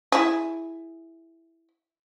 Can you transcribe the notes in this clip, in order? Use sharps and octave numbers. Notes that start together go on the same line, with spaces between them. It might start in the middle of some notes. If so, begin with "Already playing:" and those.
E4 G#4